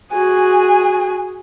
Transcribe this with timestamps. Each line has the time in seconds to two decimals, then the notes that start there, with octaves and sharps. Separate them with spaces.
0.12 F#4 G#4 G#5